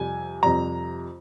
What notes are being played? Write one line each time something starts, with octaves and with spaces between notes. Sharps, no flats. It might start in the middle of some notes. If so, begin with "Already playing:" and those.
Already playing: F2 C3 G3 G#5
F2 C3 G3 A#5